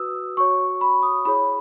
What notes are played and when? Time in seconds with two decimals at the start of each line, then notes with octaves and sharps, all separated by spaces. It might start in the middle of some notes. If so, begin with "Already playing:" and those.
Already playing: F#4 B4 D#6 E6
0.37 F#4 C#5 C#6
0.81 B5
1.03 D#6
1.25 E4 G#4 C#5 B5